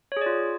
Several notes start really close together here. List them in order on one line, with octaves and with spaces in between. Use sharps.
C#5 G#4 D5 F4